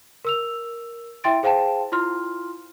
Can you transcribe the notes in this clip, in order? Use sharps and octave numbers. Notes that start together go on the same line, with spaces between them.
A#4 E6 F7
E4 E5 G5 C6 A6 D7
G#4 C5 F5 G5 A5 E7
E4 F4 C6 F6